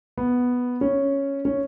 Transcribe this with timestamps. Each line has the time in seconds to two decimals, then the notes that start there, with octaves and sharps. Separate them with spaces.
0.18 B3
0.81 C#4
1.45 C#4